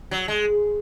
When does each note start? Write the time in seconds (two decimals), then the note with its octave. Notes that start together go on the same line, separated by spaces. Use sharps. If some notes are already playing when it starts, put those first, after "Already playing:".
0.11 F#3
0.28 G#3